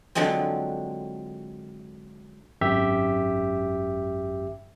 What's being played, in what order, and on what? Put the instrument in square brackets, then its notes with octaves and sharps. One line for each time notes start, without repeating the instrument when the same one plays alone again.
[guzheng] D3 F3 F#3 G#3 C4
[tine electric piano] G#1 F#2 G4 E5